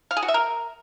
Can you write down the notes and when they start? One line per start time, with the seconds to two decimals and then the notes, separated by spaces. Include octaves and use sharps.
0.11 F5
0.17 G#4
0.22 F#4
0.28 E5
0.34 A#4